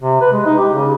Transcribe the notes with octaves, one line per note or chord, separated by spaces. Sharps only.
C3
B4
G#3
D#4
G4
C#3